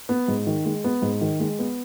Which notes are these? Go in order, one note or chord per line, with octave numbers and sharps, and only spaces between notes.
B3
G#2
D#3
G#3
B3
G#2
D#3
G#3
B3